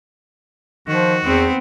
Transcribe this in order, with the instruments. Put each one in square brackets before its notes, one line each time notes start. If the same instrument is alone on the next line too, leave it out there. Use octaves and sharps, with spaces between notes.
[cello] D#3 [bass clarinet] F3 [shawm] F#4
[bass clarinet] E2 [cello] B3 C4